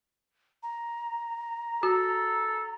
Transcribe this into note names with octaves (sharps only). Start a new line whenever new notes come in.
A#5
F#4 A4